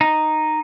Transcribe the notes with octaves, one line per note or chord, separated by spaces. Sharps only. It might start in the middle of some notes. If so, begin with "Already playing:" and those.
D#4